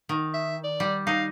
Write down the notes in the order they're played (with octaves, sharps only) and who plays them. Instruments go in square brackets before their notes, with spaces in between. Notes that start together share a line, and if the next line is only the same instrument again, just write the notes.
[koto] D#3
[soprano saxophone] E5
D5
[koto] G3
[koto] D#4 [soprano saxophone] F5